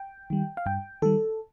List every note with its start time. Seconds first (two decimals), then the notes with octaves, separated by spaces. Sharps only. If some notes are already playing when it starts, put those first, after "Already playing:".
Already playing: G5
0.30 D#3 G3
0.57 F5
0.66 G2 G5
1.02 D#3 G3 A4